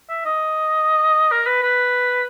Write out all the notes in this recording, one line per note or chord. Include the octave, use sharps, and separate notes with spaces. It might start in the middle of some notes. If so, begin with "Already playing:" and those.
E5
D#5
A#4
B4
B4